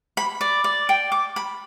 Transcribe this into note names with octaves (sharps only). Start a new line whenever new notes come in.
B5
D5
D5
G5
D6
B5